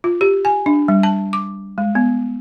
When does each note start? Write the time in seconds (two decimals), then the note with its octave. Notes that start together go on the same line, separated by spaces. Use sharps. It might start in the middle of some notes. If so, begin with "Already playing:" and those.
0.04 F4
0.21 G4
0.45 G#5
0.66 D4
0.88 G3
1.03 A5
1.33 D6
1.78 G#3
1.95 B3